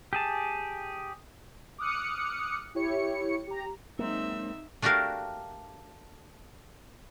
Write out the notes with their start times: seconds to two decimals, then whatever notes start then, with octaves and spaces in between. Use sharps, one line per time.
0.13 G4 G#4 A5
1.78 D6 D#6 F6 F#6 C#7
2.75 E4 G4 C#5 C#7
3.47 G4 A#5
3.99 F#3 G#3 A#3 C4 D#4 E5
4.82 A3 D4 F#4 G4 A#4 F5